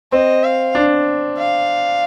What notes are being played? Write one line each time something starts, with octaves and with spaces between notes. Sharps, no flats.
C4 D#5
F5
D4
F5